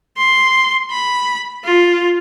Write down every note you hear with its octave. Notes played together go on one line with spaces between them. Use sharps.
C6
B5
F4